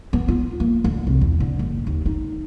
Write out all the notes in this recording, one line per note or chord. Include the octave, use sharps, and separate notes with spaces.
B3
F4
A#3
D2
C2
E2
D3
F#1
D#2
D#4